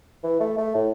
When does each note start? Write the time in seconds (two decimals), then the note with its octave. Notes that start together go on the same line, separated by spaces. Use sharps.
0.23 E3
0.40 A3
0.58 A3
0.75 A2